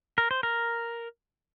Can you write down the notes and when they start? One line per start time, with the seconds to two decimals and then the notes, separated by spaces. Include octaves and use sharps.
0.18 A#4
0.31 C5
0.43 A#4